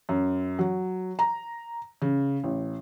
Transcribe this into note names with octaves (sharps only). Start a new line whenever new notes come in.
F#2
F#3
A#5
C#3
A1